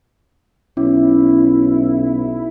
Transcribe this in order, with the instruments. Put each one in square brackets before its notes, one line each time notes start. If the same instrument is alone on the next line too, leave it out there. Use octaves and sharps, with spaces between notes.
[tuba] B1 [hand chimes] C#4 [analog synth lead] E4